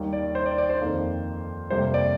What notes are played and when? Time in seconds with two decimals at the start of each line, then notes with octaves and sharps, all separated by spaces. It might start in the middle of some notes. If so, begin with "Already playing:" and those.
Already playing: D#2 D#3 G3 A#3
0.13 D5
0.35 C5
0.46 D5
0.58 D5
0.69 C5
0.80 F2 D#3 A#3
1.70 F2 C3 G3 A#3 C5
1.94 D5